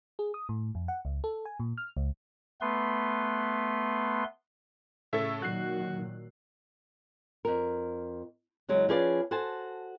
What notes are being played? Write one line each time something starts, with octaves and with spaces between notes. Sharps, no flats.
G#4
D#6
A2
F2
F#5
C#2
A4
G#5
A#2
F6
C#2
A3 B3 B4 C6
A2 C#3 A4 E5
A#2 D#3 F#3 F#4 F#6 C7
F2 A#4
E2 C#3 F#3 G#3
F3 C#4 G#4 B4 D5 F5
F#4 A4 C5 G#5 A5